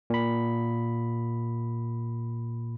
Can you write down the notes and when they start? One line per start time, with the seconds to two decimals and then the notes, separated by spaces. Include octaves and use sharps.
0.10 A#2 B5